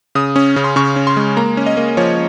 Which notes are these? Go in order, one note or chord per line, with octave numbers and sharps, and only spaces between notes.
C#3 D#6
C#4
C#3
C6
C#3 C#6
C#4
C6
G#3
A#3 A#5
C#4
D#5
A#3
F3 C#5